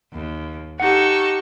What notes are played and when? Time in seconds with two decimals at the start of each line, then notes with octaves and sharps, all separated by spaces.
0.12 D#2
0.80 D#4 G4 A4 F#5 C#6